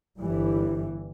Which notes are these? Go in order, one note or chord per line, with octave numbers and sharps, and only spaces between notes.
G1 E3 G3